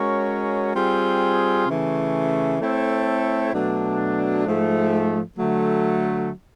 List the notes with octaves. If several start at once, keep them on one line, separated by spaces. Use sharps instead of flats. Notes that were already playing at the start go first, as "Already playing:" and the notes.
Already playing: G#3 C#4 F#4 A#4 C#5
G3 C4 F4 G#4
C#3 E3 A3
A3 C4 E4 A4 C#5
B2 F#3 A3 D4
G#2 F3 A3
D3 F#3 A3